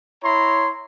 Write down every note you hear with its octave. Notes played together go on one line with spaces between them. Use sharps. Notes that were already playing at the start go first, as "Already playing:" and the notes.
E4 C#5 A#5 C6